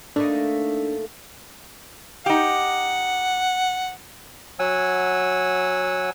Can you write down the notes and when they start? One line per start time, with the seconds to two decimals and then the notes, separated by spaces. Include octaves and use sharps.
0.16 A3 A#3 D4 D#4
2.26 D#4 G4 F#5
4.59 F#3 F#5 G#5 E6